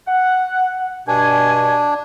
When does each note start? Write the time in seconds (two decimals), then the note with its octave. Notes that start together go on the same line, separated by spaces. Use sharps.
0.07 F#5
1.08 G2 B2 D4 G#5